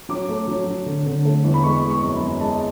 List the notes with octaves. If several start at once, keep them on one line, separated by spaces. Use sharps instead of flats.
F#3 D6
A3
F#3
F#3
D3
D3
A3
E2
B5
G#3 C#6
G#3
C#6
F#2
B5
F#2
G#3 A5